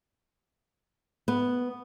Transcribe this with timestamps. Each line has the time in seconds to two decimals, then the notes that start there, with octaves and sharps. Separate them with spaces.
1.28 B3